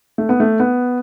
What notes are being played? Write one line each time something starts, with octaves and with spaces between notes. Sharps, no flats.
A3
B3
A3
B3